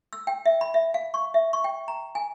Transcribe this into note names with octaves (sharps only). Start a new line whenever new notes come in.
E6
G5
E5
B5
E5
F5
C#6
E5
C#6
G5
A#5
G#5